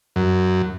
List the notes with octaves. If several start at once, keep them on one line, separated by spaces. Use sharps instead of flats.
F#2